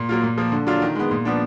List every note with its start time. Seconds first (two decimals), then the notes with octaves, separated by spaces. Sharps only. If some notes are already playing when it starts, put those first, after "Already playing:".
Already playing: A#2
0.09 F#3 A#3 F4
0.23 A#2
0.38 F3 A#3
0.52 D3
0.67 F#3 D4 F4
0.82 D#3
0.95 G#3 B3
1.11 A#2
1.25 F3 B3 D4